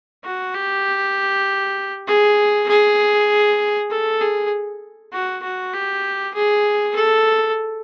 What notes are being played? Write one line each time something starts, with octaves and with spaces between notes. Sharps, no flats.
F#4
G4
G#4
G#4
A4
G#4
F#4
F#4
G4
G#4
A4